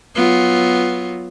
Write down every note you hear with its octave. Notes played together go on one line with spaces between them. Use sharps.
F#3 B3 F4